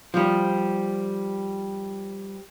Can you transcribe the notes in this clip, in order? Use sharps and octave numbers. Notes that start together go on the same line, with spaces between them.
F3 G3